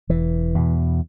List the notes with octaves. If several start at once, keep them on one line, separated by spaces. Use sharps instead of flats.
E1 E3
E2 B2